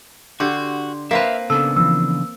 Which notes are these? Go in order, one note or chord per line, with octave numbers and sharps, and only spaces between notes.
D3 F#4 G4 C6
A#3 C4 B4 E5 F5
C#3 B3 D4 A4 E6
E3 F3 E6